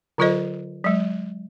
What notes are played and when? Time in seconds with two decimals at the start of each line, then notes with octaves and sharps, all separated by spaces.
0.18 D3 F#3 F4 A4 C5 D#5
0.84 F#3 G#3